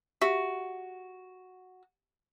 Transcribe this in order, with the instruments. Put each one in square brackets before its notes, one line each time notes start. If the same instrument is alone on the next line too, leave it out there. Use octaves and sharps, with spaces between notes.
[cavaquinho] F#4 [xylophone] G4 E5